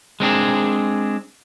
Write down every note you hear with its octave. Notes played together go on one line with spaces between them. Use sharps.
G#3 C4 D4 G#4